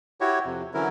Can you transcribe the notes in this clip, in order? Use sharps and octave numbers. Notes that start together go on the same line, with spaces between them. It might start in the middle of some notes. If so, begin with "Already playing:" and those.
E4 F#4 G4 C#5
F2 C3
D3 E3 F#3 C#4 E4 A#4